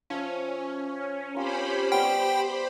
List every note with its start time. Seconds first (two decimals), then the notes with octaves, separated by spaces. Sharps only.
0.10 F3 C#4 E5
1.35 C4 F4 G4 A#4 C5 B5
1.92 G3 B3 G5